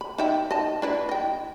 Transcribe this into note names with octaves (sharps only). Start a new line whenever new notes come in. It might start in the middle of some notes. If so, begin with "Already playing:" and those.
B5
D#4 E5 G5
D#5 A5
D4 E4 B4
D#5 G5